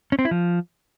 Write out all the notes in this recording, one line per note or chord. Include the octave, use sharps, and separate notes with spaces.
C#4
C4
E4
F3